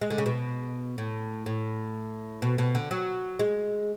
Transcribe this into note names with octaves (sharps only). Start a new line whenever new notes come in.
G#3
D3
C#3
B2
A2
A2
B2
B2
D3
F#3
G#3